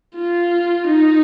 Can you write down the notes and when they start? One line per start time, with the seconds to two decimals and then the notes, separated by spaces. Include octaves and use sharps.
0.16 F4
0.88 D#4